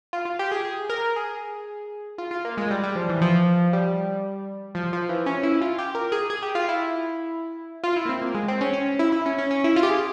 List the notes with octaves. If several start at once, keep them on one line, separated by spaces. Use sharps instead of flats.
F4
F4
G4
G#4
G#4
A#4
G#4
F4
F4
A#3
G#3
G3
G3
F3
E3
F3
G3
F3
F3
E3
C#4
E4
F4
G4
A#4
G#4
G#4
G4
F4
E4
F4
E4
A#3
C4
A#3
G#3
C4
C#4
C#4
C#4
E4
E4
C#4
C#4
C#4
E4
F4
G4
G#4